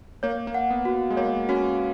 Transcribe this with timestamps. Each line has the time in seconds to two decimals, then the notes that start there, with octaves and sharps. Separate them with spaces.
0.23 A#3 C#5
0.47 A#3
0.54 F#5
0.70 B3
0.85 F#4
1.10 G#3
1.17 A#3 C#5
1.49 C#4 F#4